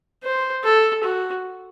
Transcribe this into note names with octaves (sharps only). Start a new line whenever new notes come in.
C5
A4
F#4